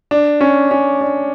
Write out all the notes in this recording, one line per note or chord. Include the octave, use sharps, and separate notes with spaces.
D4
C#4
C#4
D4